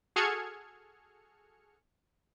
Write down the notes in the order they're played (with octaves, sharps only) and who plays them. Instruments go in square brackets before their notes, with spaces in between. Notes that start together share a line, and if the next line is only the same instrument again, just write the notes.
[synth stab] F#4 G#4 A4 F6 G#6 C#7